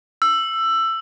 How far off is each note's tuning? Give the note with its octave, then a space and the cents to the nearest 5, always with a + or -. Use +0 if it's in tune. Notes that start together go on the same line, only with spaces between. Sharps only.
E6 +15